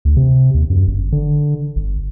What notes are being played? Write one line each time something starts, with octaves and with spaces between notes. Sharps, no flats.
D2
C3
D#2
F#2
G1
D3
G1